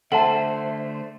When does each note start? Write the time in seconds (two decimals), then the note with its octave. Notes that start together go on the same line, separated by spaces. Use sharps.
0.12 D3 A3 A4 C5 E5 F#5 A5